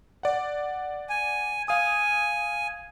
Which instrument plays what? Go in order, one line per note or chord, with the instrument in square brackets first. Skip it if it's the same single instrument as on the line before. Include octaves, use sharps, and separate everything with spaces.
[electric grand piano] D5 F#5
[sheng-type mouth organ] G#5
[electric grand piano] F5 D#6 [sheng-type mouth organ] G#5